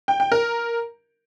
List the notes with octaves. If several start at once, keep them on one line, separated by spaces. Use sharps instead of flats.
G5
G5
A#4